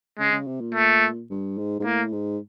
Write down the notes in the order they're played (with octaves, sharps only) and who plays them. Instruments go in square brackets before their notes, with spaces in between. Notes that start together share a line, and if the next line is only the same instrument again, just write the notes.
[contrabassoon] C#3 [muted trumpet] G#3
[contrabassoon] C#3
C3
A#2
[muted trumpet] A3
[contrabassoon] G2
G#2
G#2
[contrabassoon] A2 [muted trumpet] A#3
[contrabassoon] G#2